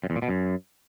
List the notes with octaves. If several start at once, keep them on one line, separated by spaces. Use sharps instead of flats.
F#2
E2
A#2
B2
F#2